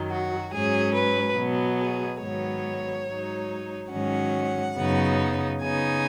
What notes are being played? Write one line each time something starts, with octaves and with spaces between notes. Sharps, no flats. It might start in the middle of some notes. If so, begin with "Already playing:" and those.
Already playing: F#2 D#3 F#3
F#4
G#2 F#3 C#4 G#4
B4
B2 F#3 B3
G#4
G#2 D#3 F#3 B3 C#5
G#2 F#3 D#4
G#2 D#3 F#3 C#4 F#5
F#2 C#3 F#3 B3 D#4
C#3 B3 D#4 G#5